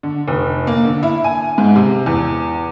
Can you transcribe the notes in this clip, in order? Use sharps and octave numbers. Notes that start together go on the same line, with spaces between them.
D3
F1
A#3
D3
E4
G#5
G#2
C3
E2